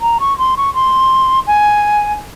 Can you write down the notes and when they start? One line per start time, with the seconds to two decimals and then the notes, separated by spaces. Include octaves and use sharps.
0.01 A#5
0.20 C#6
0.38 C6
0.57 C#6
0.74 C6
1.47 G#5